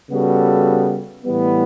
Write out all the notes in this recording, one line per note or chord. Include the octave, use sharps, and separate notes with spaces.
C#3 G3 B3 F#4 A4
A2 E3 G3 B3